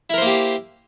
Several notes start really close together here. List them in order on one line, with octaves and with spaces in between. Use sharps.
E4 A#4 C5 A#3 G4